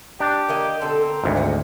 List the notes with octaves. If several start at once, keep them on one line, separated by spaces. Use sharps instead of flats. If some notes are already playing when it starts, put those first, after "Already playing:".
D4 G4
D#3 A#3 D#5
B2 D3 C4 A4
A#4
G#1 D2
D3 F#4